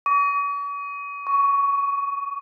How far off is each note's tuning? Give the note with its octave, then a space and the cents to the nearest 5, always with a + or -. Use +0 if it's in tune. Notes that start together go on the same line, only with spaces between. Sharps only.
C#6 +45
C#6 +15